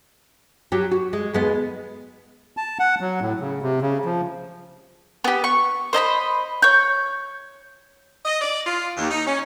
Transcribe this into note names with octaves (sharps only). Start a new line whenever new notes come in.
F#3 G4
F#4
G#3
D#2 G#3 B3
A5
F#5
F#3
A2
C#3
C3
C#3
F3
B3 G4
C#6
C5 D#5 A#5 B5
C#5 G6
D#5
D5
F4
D#2
D#4
C#4